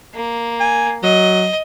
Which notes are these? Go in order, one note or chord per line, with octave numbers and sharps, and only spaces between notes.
A#3
G#5
F#3 D#5